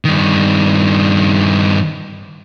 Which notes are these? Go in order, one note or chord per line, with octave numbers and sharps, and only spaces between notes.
G2 D#3